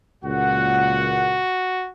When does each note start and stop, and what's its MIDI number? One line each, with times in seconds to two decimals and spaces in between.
0.24 1.41 37
0.24 1.41 46
0.24 1.90 66
0.24 1.41 78